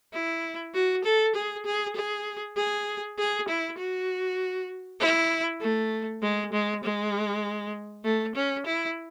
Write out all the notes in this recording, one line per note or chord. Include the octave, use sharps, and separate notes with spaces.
E4
F#4
A4
G#4
G#4
G#4
G#4
G#4
E4
F#4
E4
A3
G#3
G#3
G#3
A3
C#4
E4